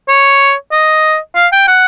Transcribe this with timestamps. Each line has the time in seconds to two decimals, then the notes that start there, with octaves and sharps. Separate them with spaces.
0.09 C#5
0.72 D#5
1.36 F5
1.53 G5
1.68 F#5